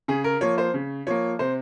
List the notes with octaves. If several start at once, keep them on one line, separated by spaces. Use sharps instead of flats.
C#3 G#4
A#4
F3 A#3 C#5
C5
C#3
F3 A#3 C#5
C3 C5